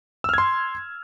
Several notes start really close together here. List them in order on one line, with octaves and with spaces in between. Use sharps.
E6 F6 G#6 C6